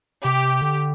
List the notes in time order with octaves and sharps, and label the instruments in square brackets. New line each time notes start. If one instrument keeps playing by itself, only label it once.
[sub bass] C3 [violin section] G4
[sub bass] D3